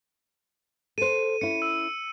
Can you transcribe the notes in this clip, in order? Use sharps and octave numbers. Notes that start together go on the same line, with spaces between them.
A4 C5 D#7
C#4 E4 C#7
E6